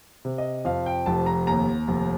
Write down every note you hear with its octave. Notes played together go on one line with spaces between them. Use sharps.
C3
D#5
F2 F5
G5
F1 A5
A#5
D#2 A#5
F1